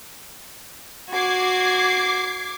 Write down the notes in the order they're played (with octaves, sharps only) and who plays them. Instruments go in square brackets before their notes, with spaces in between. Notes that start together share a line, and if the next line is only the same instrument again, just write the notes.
[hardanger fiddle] F#4 [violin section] D6 G#6 C7